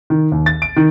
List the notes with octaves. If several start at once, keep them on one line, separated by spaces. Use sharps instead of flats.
D#3
D#2
A6
D7
D#3